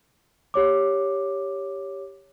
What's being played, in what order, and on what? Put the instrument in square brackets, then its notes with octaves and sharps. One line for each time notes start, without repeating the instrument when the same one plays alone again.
[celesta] G4 C#5 D6